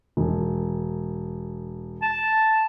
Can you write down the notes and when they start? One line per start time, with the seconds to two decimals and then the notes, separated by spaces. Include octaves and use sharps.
0.17 E1
2.02 A5